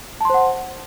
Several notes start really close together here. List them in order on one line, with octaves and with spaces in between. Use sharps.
A5 C6 C5 F#5